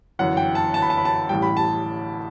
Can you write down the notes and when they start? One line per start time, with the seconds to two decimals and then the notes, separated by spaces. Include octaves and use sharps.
0.19 G1 F#2 E3 F#5
0.37 G5
0.55 A5
0.74 A5
0.82 B5
0.90 A5
0.97 B5
1.05 A5
1.29 A1 A2 G3 G5
1.42 B5
1.57 A5